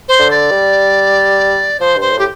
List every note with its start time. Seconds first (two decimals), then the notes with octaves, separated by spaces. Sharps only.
0.08 C5
0.19 D3
0.31 D5
0.51 G3
1.80 F3 C5
1.96 G2 C5
2.12 A2
2.19 G4